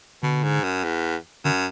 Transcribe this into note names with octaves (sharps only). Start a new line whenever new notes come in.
B2 D3
G#2
F#2
E2
F#2 D3